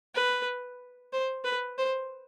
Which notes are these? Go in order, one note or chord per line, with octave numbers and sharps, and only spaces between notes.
B4
C5
B4
C5